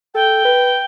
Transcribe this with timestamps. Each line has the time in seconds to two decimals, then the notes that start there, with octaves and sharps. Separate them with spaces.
0.15 A4 G5
0.45 B4